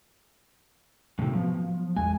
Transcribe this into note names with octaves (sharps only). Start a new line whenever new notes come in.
A2 C3 D#3 A3 C4
F3 F#3 B3
G#1 E2 G#3 G#5